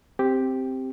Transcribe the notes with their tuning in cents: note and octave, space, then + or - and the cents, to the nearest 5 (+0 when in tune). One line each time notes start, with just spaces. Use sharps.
C4 +0 G4 +0